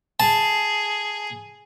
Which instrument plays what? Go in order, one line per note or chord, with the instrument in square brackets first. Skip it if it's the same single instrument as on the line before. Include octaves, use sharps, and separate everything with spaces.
[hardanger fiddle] G#4 [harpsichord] A5